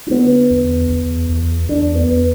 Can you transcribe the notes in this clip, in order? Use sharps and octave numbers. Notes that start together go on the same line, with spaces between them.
D4
D3 B3
E2
E2
E2
E2 D4
B3
E2